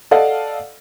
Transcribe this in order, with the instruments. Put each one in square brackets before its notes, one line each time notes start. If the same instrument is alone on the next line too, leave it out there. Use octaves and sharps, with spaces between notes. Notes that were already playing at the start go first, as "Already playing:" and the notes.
[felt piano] A4 D5 D#5 F5 F#5